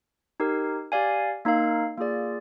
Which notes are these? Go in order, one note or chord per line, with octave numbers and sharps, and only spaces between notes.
D#4 G4 A#4
G4 D5 F5 G#5
A#3 D#4 A#4 F5
A#3 F4 G#4 D5